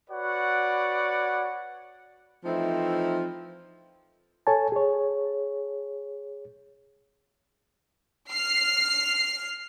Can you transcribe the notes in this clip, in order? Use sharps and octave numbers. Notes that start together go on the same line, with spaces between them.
F#4 B4 C#5 D5 F#5
E3 F3 A3 C4 D#4 E4
A4 C#5 G#5 A5
G#4 C#5
F6 C7